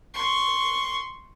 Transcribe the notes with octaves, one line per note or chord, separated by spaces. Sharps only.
C6 C#6